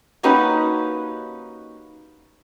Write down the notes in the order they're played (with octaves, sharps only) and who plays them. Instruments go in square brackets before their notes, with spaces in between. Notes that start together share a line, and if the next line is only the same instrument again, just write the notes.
[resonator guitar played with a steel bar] A#3 C#4 D#4 F#4 G4 B4